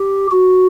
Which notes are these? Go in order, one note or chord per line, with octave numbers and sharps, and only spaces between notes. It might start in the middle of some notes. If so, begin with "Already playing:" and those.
Already playing: G4
F#4